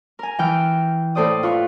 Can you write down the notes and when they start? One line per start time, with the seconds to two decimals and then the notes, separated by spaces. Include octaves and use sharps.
0.19 A#4 G#5
0.39 E3 G5 F6
1.15 A2 A4 C5 D5 D#6
1.43 F4 B4 C#6